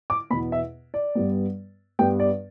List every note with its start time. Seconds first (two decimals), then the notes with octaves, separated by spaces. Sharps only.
0.10 D6
0.30 E2 B2 B3 B5
0.52 E5
0.94 D5
1.15 G2 G3 B3
1.99 G2 G3 B3 G5
2.20 D5